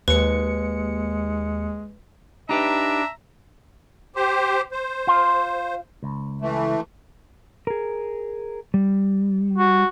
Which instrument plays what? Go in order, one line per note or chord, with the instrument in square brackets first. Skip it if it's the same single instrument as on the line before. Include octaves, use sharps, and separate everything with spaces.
[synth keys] D#2 C#7 [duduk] G#3 [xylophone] B4
[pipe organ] D4 [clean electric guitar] D#4 G4 B4 [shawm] E5 [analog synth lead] A#5
[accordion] G4 C5
C5
[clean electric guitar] F4
C#2
[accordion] E3 A3
[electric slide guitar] G#4 A#4
G3
[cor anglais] F#4